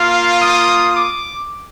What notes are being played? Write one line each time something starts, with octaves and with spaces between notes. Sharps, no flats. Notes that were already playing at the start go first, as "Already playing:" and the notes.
Already playing: A#3 F4 F5
D#6
D6